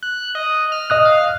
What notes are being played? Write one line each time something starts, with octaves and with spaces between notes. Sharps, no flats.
F#6
D#5
F6
D#5 D#6 F#6
F5